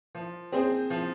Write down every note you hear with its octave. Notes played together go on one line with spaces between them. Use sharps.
F3
C4 G#4 C5
F3